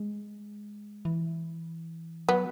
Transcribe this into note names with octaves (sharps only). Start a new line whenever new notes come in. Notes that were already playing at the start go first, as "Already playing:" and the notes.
Already playing: G#3
E3
F#3 B3